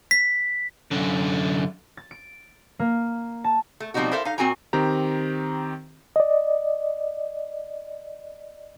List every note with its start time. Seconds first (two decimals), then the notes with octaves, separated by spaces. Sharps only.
0.11 B6
0.91 F#2 D3
1.97 A6
2.11 D7
2.79 A#3
3.44 A5
3.80 A3
3.94 B2 F3 G3 C4 D#4 F#4
4.11 E4 A4 A#4 C5 E5 F5
4.25 D#4 F5
4.38 A#2 C4 F#4 A#4 G#5 A#5
4.73 D#3 C4 G4 A#5
6.16 D5 D#5